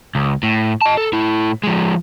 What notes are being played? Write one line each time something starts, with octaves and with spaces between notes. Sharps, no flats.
C#2
A2
D#5 A5
A4
A2 E4
F3 G#3